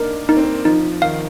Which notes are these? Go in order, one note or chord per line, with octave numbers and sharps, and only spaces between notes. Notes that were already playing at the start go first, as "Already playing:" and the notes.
Already playing: A#3 D4 D#4 A#4
A#3 D#4
C4
A#3
F3 D#4
D#3 F5